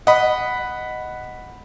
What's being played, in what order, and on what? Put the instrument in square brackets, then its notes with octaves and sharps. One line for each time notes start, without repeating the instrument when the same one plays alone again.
[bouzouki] D#5 [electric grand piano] F#5 B5